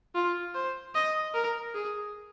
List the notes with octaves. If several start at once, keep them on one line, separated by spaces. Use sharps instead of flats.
F4
C5
D#5
A#4
G#4